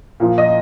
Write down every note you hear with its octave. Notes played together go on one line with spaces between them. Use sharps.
A#2 F3
D#5